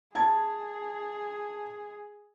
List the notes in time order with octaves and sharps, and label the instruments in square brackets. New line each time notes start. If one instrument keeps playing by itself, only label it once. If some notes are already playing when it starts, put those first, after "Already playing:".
[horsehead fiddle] G#4 [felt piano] A5 G#6